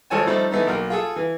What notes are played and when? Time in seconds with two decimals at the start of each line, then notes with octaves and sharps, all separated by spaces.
0.10 G#1 F3 A4 C#5 G#5 A5
0.27 F3 G3 A3 C4 D#4
0.51 E3 A3 B3 D#4
0.67 B1 A#3 A#4
0.90 F4 G#4 A4
1.16 E3